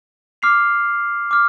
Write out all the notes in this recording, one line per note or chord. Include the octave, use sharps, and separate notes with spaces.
D6 F6 C7 F7
D6 F6